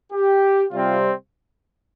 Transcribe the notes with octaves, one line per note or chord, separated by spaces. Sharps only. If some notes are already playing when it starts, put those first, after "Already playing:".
G4
C3 G3 C4 F4